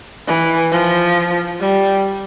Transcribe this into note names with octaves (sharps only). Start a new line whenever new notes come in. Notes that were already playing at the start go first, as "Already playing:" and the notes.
E3
F3
G3